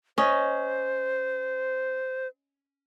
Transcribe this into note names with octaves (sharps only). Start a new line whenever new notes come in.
C#4 C5 D#5